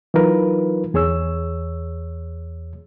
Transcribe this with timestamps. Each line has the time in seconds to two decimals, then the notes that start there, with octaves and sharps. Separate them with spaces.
0.14 E3 F#3 D#4 F4 A#4 B4
0.94 E2 G#4 C#5 E6